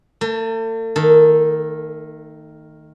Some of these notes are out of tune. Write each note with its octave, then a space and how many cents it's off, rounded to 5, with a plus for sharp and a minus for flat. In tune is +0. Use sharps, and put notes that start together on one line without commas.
A3 +40 A5 +0
D#3 +0 A4 +0 A5 +0